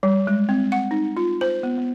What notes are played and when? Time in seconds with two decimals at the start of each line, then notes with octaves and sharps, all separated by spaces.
0.03 G3
0.27 G#3
0.49 C4
0.72 F#5
0.91 D#4
1.17 F4
1.41 C5
1.63 B3
1.78 B3